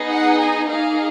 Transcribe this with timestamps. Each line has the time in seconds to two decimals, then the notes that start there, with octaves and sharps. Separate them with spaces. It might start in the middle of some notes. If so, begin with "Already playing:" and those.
Already playing: B3 D#4 G#4
0.08 F#5
0.39 G#5
0.69 A#3 D#4 G#4 F5